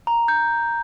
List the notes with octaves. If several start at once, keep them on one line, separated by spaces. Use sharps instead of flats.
A#5
G6